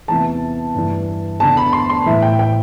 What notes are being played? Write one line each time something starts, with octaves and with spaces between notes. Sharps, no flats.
E2 C3 E3 A5
G2 E3
E2 D3 A5
B5
C6
C6
A2 E3 E5
G5
G5